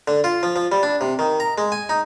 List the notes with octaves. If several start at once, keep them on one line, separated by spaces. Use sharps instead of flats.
D3
F4
F3
F3
G3
D4
C3
D#3
A#5
G#3
G#5
D#4